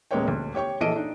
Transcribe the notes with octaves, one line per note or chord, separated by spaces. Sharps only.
D#1 G#3 A#3 B3 C#5 G5
D2
G4 C#5 G5 C#6
A#1 E3 A4 D#5 D7 D#7
D4 D#4